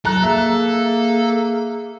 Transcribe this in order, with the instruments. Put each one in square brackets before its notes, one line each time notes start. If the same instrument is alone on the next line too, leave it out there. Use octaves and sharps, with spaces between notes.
[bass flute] F#3 [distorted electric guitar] A4 [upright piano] A#5 F#6
[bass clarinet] A#3 [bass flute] G#4 [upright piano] E5